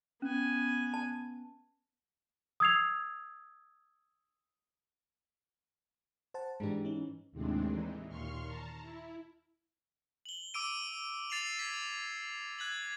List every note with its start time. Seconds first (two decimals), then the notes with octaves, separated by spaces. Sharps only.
0.22 B3 C#4 G#5
0.94 A5
2.60 D#6 E6 G#6 C7 F7
6.34 C5 F#5 A5
6.60 G#2 E3 G#3 D4 G4
6.85 C#4 D#4
7.32 D#2 A2 C3 G#3 C4 D4
7.69 E3 D#4
8.09 D#2 A#2 C6 C#6 F6
8.47 A5 A#5
8.82 E4
10.26 F#7 G7
10.54 D6 E6 D7 D#7
11.30 A6 C7 E7 F7
11.59 G#6 B6
12.59 F#6 G#6 B6 F#7